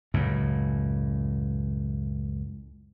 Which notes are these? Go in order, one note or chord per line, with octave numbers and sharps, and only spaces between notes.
C#2 F#2 A2